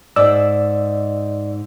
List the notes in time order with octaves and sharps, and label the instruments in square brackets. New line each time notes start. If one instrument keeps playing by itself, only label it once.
[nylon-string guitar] G#2 [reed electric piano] D5 E6